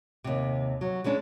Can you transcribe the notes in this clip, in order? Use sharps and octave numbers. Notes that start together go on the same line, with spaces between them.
D#2 C3
F#3
E3 G#3 C#4 D4